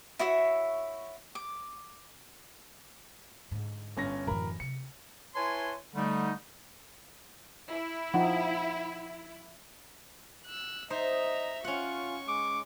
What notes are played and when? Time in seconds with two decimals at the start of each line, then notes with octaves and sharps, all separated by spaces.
0.19 E4 F#4 C#5 E5
1.35 D6
3.51 G#2 D3
3.97 G1 C#4 A#6
4.27 D1 F#2 E3 A#4 B5
4.60 C3 C#7
5.35 E4 B4 C#5 G#5 A5 C6
5.94 D3 G3 A3 D#4
7.71 E4
8.14 F3 D#4 F#5 G5
10.46 E6 F#6
10.90 D#4 C5 D#5 E5 A#5
11.64 C#4 F4 F#5 C#6
12.28 G#3 D6